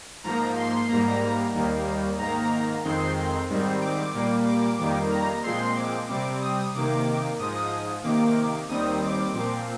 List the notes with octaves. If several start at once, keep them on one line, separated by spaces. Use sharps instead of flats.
G#2 F3 A#3 A#5
C6
G#2 G3 A#3 A#5
D#2 D#3 G3 A#3
G#2 D#3 A#3 A#5
F2 D#3 G#3 C4 C6
G#2 D#3 G3 C4
D6
A#2 G3 A#3
D6
F2 D#3 G3 A#3
A#5
A#2 F3 G#3 C4 C6
D6
C3 G3 C4 D6
D#6
C3 D#3 A#3 D6
G#2 F3 G#3 D#6
C3 D#3 A#3 D6
D#2 D#3 G3 C4 D#6
D6
A#2 F3 C4